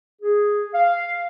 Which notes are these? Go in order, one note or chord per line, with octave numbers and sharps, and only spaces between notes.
G#4
F5